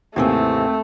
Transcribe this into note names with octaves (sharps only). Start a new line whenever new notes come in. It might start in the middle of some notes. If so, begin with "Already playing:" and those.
D#2 G#2 C3 E3 A3 A#3 C4